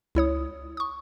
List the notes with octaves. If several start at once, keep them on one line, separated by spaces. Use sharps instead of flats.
C#2 E4 C#5 D#6
C#6 D#6